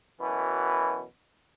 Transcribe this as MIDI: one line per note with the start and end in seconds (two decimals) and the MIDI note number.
0.20 1.03 42
0.20 1.03 47
0.20 1.03 52